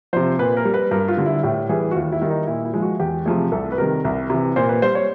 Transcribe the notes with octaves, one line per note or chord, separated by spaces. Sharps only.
C3 F3 C5
A#2 B4
A#4
G3
B4
G2 A#4
F4
D3 G3
E4
A2 G4
E3 G3 G#4
F#4
D#2 F4
E4
D#3 G3
D#4
A#2 E4
E4
F3 G#3
F#4
E2 G4
C3 F3 A3 G#4
C2 A4
B4
C3 D#3 G3 A#4
C2
C3 E3
A#2 C5
B4
G3 C5
C#5